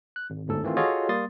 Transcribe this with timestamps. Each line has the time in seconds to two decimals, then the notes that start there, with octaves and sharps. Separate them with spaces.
0.16 F#6
0.30 G#1
0.48 G1 D2 G#2 A4
0.63 D#3 E3 A3 C4 F4
0.77 F4 F#4 G#4 A4 C#5 D#5
1.09 G3 A#3 C6 D#6 A6